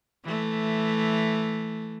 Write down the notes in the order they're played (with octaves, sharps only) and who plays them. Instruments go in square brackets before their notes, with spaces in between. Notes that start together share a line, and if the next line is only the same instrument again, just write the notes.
[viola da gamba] E3 A3